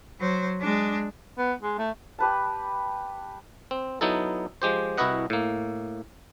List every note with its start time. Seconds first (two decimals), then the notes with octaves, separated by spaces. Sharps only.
0.19 F#3 C5
0.61 G#3 D4
1.38 B3
1.62 G#3
1.78 A3
2.19 G4 B4 A5
3.71 C4
4.01 F#3 B3 D#4 E4 A4
4.62 F3 G#3 G4 C5
4.98 C2 E4 F#4 B4 D#5 F#5
5.30 A2 A#3